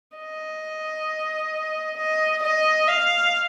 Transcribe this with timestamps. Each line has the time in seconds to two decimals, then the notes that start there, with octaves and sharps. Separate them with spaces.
0.17 D#5
1.98 D#5
2.43 D#5
2.88 F5